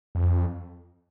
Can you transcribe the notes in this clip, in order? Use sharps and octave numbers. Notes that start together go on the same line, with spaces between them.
F2